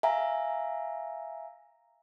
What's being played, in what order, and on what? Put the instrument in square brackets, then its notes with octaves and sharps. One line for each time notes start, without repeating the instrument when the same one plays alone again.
[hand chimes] E5 F5 G#5 A#5